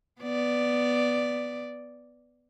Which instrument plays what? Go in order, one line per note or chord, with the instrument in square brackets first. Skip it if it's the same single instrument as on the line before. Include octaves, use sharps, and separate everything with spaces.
[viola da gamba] B3 D5